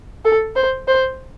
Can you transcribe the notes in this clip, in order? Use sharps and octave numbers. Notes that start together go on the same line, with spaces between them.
A4
C5
C5